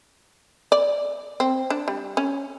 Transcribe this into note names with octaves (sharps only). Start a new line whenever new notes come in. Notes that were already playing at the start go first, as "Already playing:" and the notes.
D5
C4
D4
G3
C#4